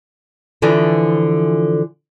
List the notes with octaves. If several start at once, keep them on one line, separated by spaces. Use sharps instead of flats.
D3 E3 F3